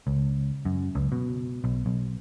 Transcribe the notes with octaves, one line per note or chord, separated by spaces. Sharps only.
C#2
F#2
C#2
B2
B1
B1